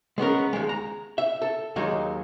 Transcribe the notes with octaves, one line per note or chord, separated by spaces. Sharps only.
G#3 B3 C#4 A#4
D#2 G#3
A#5
E5
A4
D#2 D#3 F#3 G#3